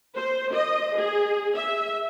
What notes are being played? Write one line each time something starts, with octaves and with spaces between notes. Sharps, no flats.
C5
D#5
G#4
E5